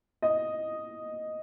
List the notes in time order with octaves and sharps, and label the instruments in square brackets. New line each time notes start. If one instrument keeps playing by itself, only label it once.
[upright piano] D#5